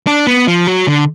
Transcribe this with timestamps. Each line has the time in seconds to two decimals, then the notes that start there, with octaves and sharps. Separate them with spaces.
0.07 D4
0.27 B3
0.48 F3
0.67 F#3
0.87 D3